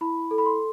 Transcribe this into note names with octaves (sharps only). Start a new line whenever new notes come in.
E4 B5
A4
B5
C6